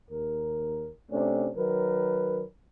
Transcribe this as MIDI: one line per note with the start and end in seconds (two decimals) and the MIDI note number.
0.10 0.89 39
0.10 0.89 70
1.10 1.48 48
1.10 1.48 57
1.10 1.48 61
1.10 1.48 62
1.56 2.42 51
1.56 2.42 54
1.56 2.42 70
1.56 2.42 71